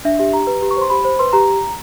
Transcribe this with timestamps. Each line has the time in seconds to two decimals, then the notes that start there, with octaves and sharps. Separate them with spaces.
0.05 D4 E5
0.19 G4 E5
0.33 G4 A#5
0.47 B4
0.62 G4
0.71 C#6
0.77 C5 C6
0.90 G4 B5
1.05 C5
1.19 B4 C6
1.33 G4 A#5